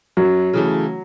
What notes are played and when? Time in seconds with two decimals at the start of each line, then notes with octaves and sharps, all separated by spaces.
0.17 F#2 F#3
0.53 C#3 E3 A3